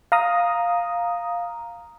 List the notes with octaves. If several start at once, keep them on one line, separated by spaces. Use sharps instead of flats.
F5 A#5 D#6